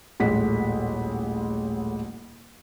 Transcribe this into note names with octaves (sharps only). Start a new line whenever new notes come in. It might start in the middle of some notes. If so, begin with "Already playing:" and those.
D#1 A1 G#3 A3 F#5 B6